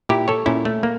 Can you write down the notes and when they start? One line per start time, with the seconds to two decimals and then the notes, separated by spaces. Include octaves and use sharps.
0.09 A#2 E4 G4
0.28 A4 C#5
0.46 A#2 C#4 E4
0.65 A3
0.83 A#3